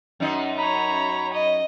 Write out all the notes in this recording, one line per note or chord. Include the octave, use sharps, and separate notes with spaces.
F#2 D#4
C#5 A#5 B5
D#5